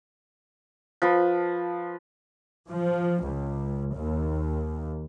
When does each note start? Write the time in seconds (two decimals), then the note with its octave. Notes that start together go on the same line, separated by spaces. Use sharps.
1.02 F3 B4 B5
2.70 F3
3.23 C#2
3.96 D#2